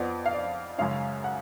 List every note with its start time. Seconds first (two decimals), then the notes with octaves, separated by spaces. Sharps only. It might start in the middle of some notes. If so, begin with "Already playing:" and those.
Already playing: F2 F3 B3 D5
0.26 F5
0.33 D5
0.78 F#2 C#3 G#3 C#4 F5
1.24 F#5